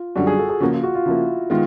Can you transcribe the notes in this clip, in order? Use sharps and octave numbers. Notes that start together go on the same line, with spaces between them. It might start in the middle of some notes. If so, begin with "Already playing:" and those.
Already playing: F4
F#2 D3 G3 F#4
G#4
A4
G#4
C#3 F3 A#3 F#4
F4
F#4
F4
C#3 F3 A#3 E4
D#3 G#3 B3 F4